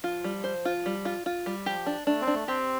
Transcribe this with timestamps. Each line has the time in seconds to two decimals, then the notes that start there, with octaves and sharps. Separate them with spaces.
0.04 F3 F4
0.24 G3
0.44 C5
0.65 F4
0.86 G3
1.05 F4
1.26 F4
1.46 G3
1.66 F3 G4
1.86 D4
2.07 A3 D4
2.21 C4
2.27 D4
2.34 A3
2.48 C4 G4